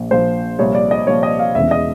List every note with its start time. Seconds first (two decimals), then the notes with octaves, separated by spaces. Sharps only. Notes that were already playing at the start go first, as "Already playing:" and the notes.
Already playing: A#1 A#2 F3
0.11 A#1 A#2 F3 C5
0.59 C2 A#2 F3 C#5
0.75 D5
0.91 D#5
1.07 C2 A#2 F3 C#5
1.23 D#5
1.39 F5
1.55 E1 E2 C#3 E3 E5
1.71 D#5